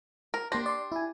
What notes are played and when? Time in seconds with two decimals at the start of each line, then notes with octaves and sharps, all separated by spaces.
0.34 A#4
0.52 A#3 D4 G4 C6 A#6
0.66 D5 C6
0.92 E4 G#5